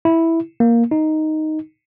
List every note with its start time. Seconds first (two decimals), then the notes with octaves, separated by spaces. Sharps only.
0.05 E4
0.60 A#3
0.91 D#4